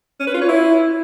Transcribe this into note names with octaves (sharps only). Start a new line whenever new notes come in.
C#4
B4
F4
C#5
E4